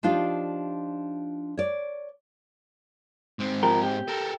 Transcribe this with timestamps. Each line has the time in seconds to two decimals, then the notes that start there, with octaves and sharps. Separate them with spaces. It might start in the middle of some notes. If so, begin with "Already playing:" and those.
0.03 F3 D4 D#4 F4 G4 D5
1.57 C#5 D5
3.39 G#2 C4
3.63 F3 G4 A#4
3.83 G4
4.08 A4 A#4